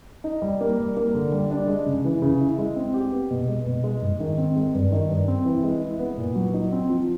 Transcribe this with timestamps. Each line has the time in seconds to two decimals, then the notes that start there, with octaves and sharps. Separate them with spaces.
0.24 D#4
0.42 G3
0.61 A#3
0.78 G3
0.97 A#3
1.14 D3
1.32 G3
1.51 D4
1.68 G#3
1.86 C#3
2.05 E3
2.22 C#3
2.40 E4
2.58 G#3
2.76 C4
2.94 G4
3.12 B3
3.31 B2
3.48 G#3
3.66 B2
3.84 G#3
4.02 G#2
4.20 D#3
4.38 C4
4.56 G#3
4.74 G2
4.92 D#3
5.09 G2
5.28 C4
5.45 E3
5.64 G#3
5.81 E4
5.99 B3
6.17 A#2
6.35 F#3
6.54 D#4
6.72 C4
6.90 F3